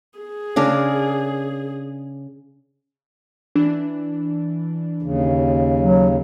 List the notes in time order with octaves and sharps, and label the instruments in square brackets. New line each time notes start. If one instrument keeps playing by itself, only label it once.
[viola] G#4
[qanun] C#3 D4 A#4
[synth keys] E3 D4
[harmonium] D#2 C#3
[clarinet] F#3